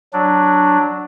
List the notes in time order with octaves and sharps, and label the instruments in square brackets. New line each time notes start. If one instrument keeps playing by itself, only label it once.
[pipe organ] F#3 D4